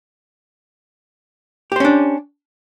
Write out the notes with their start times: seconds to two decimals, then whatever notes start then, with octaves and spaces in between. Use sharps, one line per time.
1.72 G4
1.76 C5
1.80 C#4
1.85 D4